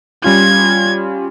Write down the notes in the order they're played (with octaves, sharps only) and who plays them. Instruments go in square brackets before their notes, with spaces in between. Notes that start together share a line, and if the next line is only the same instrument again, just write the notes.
[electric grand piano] G3 C#4 F4 [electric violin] G#6